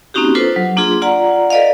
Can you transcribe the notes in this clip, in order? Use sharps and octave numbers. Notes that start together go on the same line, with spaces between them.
A#3 C4 C#4 D#4 F#4 G4
D4 F4 A4 B4 C5
F#3
A#3 D4 F4 G#4 C6
F4 D5 F#5 A#5
A4 B4 D5 D#5 F5